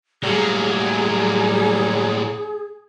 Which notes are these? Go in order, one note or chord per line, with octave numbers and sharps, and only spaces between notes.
A2 F#3 G3 A#3 G#4